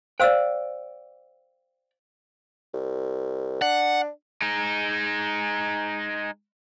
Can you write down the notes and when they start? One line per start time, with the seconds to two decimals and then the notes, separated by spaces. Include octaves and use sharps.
0.20 C5 D5 F5 G5 E6
2.74 C2
3.62 D4 F#5
4.42 G#3 D#4